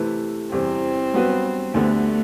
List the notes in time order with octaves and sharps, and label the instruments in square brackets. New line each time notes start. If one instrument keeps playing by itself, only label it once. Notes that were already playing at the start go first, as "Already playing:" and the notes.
Already playing: [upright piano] C3 E3 A3 E4 B4
[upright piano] E2 C3 E3 G3 [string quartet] C4
[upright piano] G2 F#3 B3 F#4 B4
[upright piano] D2 D3 G3 B3 [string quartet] A3